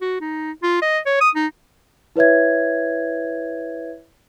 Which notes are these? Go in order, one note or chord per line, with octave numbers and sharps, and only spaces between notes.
F#4
D#4
F4
D#5
C#5
D#6
D#4
E4 B4 C#5 E5 G#6